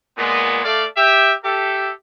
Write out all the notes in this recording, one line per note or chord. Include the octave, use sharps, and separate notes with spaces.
A#2 G#3 B3
A3 D5 F5
G4 E5 G5
G4 A4 E5